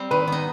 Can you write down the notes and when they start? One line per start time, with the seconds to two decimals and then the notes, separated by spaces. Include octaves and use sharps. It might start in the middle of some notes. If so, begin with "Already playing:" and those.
Already playing: G3 C4
0.11 D#3 B4
0.28 B3 D#4